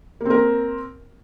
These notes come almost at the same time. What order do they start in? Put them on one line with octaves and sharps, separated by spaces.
A#3 C4 A#4